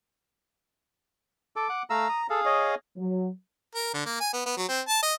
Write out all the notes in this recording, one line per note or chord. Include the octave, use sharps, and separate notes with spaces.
A4 D6
F#5
A3 F5 A#5 E6
D#6
G#4 A4 F5
C#5 D#5
F#3
A#4
D3
A#3
G#5
B3
B3
F#3
C4
A5
D#5